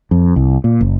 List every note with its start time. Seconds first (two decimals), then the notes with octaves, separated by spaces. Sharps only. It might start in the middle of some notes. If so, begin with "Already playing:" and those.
0.11 F2
0.36 C2
0.64 A#2
0.81 F#1